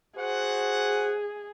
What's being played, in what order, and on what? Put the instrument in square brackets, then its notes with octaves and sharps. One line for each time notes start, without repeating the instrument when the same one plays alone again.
[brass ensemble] F#4 C5 F#5 [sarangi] G#4